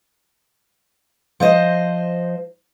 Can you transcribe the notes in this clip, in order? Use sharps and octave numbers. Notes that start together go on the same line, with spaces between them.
F3 C5 D#5